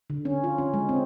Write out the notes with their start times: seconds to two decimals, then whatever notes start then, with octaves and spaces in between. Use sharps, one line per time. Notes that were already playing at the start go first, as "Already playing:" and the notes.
0.10 D3
0.25 C#4
0.44 F4
0.58 C#4
0.74 G#3
0.89 C4